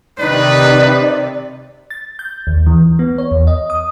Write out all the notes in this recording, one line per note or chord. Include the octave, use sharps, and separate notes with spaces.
C3 D#3 D#4 B4 D5
A6
G6
D#2
E3
B3
C#5
E2
D#5
D#6